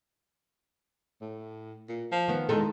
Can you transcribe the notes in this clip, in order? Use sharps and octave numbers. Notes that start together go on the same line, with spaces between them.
A2
A#2
F3
D#3 B3
E2 D#3 G#3 A4